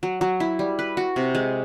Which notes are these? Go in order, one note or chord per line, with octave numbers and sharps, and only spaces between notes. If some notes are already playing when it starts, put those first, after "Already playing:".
F#3
F#3
E4
G3
B4
F#4
C3
G#3